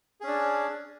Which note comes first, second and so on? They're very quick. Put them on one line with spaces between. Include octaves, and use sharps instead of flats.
G#4 C#4 D4